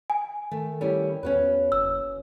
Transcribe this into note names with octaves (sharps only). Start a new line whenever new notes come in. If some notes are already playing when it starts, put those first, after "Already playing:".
G#5
D#3 A3
G3 C#4 E4
E2 C#4 F#4 B4
F#1 E6